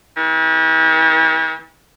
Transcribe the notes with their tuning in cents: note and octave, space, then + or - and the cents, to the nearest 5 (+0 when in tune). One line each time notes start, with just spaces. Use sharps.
E3 -45